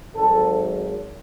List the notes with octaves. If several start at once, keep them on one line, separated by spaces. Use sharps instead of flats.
G#1 G#2 F#3 A4